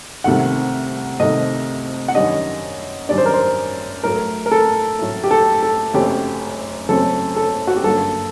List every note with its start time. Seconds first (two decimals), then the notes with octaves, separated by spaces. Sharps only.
0.24 C2 C3 D#3 A3 F#5
1.19 C2 C3 D#3 A3 D#5
2.08 F#5
2.15 F#2 D#3 G3 D4 D#5
3.09 F#2 D#3 G3 D4 D5
3.18 C5
3.26 A#4
3.33 C5
4.03 A2 F#3 A3 A#4
4.46 A#4
4.52 A4
4.99 A2 F#3 A3
5.24 G4
5.31 A4
5.63 A4
5.93 F#1 F#2 F#3 A3 C4 G4
6.89 F#1 F#2 F#3 A3 C4 A4
7.36 A4
7.67 F#4
7.76 G4
7.84 G1 G2 F#3 A#3 A4